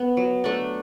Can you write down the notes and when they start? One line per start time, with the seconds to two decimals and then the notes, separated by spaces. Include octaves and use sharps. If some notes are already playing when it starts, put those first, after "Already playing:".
Already playing: B3
0.17 F#3
0.44 A3 D4